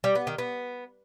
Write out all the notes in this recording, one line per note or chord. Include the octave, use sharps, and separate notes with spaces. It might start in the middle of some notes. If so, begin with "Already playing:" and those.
G3
B3
D#3
B3